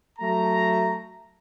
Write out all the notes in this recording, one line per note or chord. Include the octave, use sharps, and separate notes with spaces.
F#3 A3 A#5